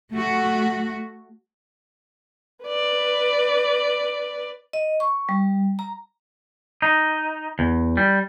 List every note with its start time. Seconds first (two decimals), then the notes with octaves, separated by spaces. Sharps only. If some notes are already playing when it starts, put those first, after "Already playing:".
0.13 A3 F#4
2.65 B4 D5
4.73 D#5
5.00 C#6
5.29 G3
5.79 A#5
6.82 D#4
7.59 E2
7.97 G3